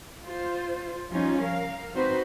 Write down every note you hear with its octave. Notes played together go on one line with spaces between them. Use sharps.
F4 C5
F3 G3 C#4 D#4 F4
A#4 F5
C4 D#4 F#4 B4 C5